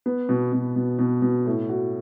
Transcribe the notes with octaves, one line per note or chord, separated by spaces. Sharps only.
B3
B2
B2
B2
B2
B2
A2
F#4